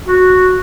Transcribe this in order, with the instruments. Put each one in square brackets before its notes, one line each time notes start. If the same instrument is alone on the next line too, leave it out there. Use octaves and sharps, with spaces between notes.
[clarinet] F#4